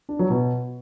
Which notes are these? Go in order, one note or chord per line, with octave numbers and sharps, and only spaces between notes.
D4
F#3
B2